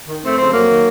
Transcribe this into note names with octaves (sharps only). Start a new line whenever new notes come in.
D#3
F2 A3 C4
C#3 F3 A3 C4
F2 F#3 A#3
D#3